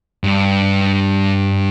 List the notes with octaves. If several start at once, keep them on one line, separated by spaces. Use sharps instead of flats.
G2